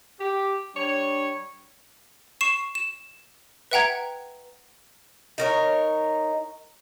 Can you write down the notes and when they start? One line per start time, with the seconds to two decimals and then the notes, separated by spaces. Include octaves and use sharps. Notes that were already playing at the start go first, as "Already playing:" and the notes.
0.20 G4
0.76 G3 D4 C#5
2.41 C#6 C7 E7
2.75 E7
3.71 B4 E5 F#5 G5 A#5 G#6
5.38 D#4 A#4 C#5